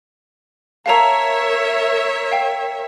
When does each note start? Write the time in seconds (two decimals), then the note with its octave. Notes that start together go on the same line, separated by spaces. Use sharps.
0.86 A#4 C#5 E5 F5 A5 A#5
2.31 F5 G5